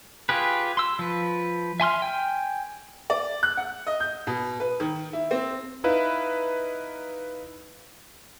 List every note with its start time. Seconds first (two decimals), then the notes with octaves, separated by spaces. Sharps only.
0.29 F4 G4 G#4 B4
0.77 C6 E6
0.99 F3 B4
1.80 E5 G#5 C6 F6
2.02 G5 G#5
3.10 D5
3.43 F#6
3.57 F#5
3.87 D#5
4.00 G6
4.27 B2
4.60 B4
4.80 D#3
5.13 E4
5.31 C4
5.84 D#4 E4 B4 F5